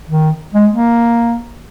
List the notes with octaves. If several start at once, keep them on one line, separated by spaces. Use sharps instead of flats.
D#3
G#3
A#3